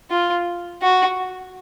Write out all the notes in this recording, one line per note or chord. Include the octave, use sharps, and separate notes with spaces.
F4
F#4